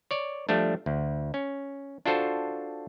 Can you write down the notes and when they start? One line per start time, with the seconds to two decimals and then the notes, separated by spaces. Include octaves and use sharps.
0.11 C#5 D5
0.49 F3 G3 A3 D4
0.86 D2
1.34 C#4
2.06 D4 F4 F#4 A4 C5